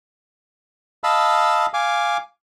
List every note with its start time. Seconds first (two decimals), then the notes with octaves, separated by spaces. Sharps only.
1.04 D#5 F5 A5 B5 E6
1.74 F5 G#5 D6